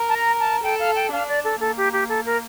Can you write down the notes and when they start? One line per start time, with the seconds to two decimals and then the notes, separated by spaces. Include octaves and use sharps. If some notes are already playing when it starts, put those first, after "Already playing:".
Already playing: A#4
0.09 A5
0.15 A#5
0.40 A5
0.63 A4 G5
0.79 F5
0.96 G5
1.12 D4 F5
1.28 D5
1.44 A4
1.60 A#3 A4
1.77 G4
1.93 G4
2.09 A4
2.26 A#4